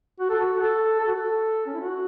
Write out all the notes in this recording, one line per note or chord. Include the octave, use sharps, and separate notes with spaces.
F#4
A4
F#4
A4
A4
F#4
A4
C#4
E4
F#4